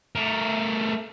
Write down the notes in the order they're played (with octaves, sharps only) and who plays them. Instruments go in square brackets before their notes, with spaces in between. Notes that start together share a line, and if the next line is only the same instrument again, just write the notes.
[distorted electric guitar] A3 A#4